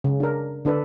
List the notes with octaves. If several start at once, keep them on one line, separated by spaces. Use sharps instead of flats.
C#3
D4 A#4
D3 D4 A4 B4